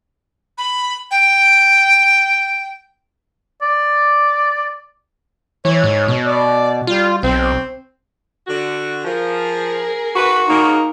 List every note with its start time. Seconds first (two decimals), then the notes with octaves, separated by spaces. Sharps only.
0.58 B5
1.11 G5
3.62 D5
5.65 E3 C#5
5.84 G#2
6.08 B2
6.25 D5
6.87 G3 F4
7.23 B1 C4
8.47 D3 F#4
9.04 F3 G#4 A#4
10.15 F#4 B4
10.48 C#3 A#3 D#4